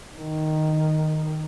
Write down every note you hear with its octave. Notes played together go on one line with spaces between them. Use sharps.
D#3